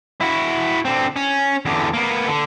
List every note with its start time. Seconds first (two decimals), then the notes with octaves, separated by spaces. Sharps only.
0.21 E4 F#4
0.85 D3 C4
1.16 C#4
1.66 E2 D3
1.94 A#3 B3
2.28 D3